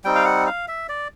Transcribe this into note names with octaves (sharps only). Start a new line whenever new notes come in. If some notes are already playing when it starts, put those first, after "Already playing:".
G3 C4 D#4 G5
F5
F#5
F5
E5
D5